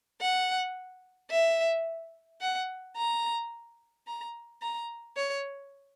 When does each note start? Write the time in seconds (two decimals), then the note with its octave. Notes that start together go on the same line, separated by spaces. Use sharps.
0.21 F#5
1.31 E5
2.41 F#5
2.97 A#5
4.07 A#5
4.62 A#5
5.17 C#5